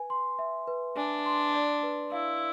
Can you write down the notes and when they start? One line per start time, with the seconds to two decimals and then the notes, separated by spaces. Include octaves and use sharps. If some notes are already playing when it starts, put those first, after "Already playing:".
Already playing: B4 G#5
0.10 C6
0.39 E5
0.67 B4
0.97 D4 G#5
1.26 C6
1.54 D5
1.83 B4
2.11 E4 F5